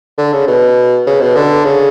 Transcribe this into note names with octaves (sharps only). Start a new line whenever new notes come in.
D3
C#3
B2
C#3
B2
D3
C#3